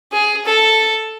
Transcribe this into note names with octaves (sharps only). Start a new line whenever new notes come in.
G#4
A4